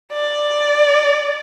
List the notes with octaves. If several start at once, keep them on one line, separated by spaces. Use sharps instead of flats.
D5